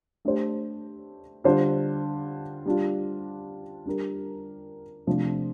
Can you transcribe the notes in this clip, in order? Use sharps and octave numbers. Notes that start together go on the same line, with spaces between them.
A3 D4 G4 C5
D3 G3 D4 F4 C5
G3 D4 F4
G3 D4 G4 A#4
C3 F3 A3 D4